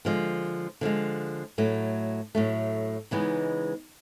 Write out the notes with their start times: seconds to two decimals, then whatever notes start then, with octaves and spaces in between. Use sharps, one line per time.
0.05 D3 F3 G#3
0.81 D3 F3 G#3
1.58 A2 F#3 A3
2.35 A2 F#3 A3
3.11 C#3 E3 G#3 B3 D#4